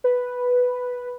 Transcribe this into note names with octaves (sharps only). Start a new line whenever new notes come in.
B4